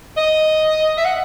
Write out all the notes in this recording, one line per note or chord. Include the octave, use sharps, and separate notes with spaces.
D#5
E5
F#5